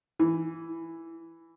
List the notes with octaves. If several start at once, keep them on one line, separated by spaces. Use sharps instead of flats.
E3